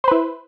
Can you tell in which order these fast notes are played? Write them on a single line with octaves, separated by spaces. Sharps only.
C5 B4 E4